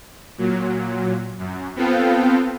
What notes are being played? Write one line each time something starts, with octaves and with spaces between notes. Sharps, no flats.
A#2 F#3
F#2
B3 C4 F4 A4 F5 G5